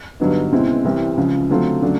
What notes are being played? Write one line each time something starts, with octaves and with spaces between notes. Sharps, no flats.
G2 D3 F#3 B3 D#4
C#2 B2 G#3 C4 E4
C2 C3 E3 G3 C4
C#2 C#3 F3
D3 F#3 A3 C4 F4
C#3 F#3 A3 D4